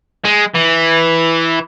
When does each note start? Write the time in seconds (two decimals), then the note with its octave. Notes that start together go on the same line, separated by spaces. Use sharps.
0.25 G#3
0.54 E3